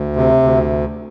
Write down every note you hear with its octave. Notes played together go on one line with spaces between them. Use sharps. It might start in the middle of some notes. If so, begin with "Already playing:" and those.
Already playing: D2
C3
D2